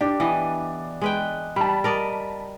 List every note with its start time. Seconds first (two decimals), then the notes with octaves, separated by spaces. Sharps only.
0.01 D4 G4
0.20 E3 B3 D#5
1.02 G#3 B4 G5
1.56 G3 A5 B5
1.84 A#4 D5 D#5